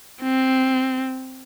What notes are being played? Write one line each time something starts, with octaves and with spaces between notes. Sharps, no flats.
C4